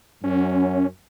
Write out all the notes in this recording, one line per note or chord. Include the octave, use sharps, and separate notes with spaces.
F#2 C#4